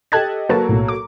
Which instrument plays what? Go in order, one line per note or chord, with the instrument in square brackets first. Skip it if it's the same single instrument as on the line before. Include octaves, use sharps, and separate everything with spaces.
[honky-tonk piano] G4 A4 D#5 [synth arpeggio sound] A5 F#6 G#6
[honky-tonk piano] F#3 A#3 A4 [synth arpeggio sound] F#4 B4 A5
[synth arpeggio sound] B1 A2
D6